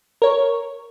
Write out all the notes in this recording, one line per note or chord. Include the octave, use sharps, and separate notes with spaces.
A#4 C#5